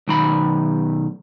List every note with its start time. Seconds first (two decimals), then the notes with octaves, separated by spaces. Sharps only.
0.08 B1 D#3 B5